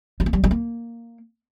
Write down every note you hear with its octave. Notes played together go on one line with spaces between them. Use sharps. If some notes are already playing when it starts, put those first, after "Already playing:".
G3
A#3
G3
G3
A#3